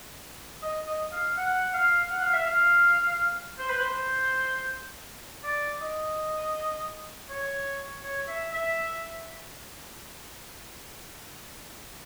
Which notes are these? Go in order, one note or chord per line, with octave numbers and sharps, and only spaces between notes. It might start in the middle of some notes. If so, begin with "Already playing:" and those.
D#5
D#5
F5
F#5
F5
F#5
F5
E5
F5
C5
B4
C5
D5
D#5
C#5
C#5
E5
E5